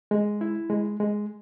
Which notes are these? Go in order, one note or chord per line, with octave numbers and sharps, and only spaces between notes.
G#3
E4
G#3
G#3